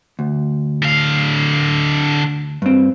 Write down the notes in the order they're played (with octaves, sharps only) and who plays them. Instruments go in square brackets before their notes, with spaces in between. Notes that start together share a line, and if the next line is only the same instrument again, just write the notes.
[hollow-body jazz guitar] D2
[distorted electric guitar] D3 F5
[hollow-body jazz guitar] G2 C4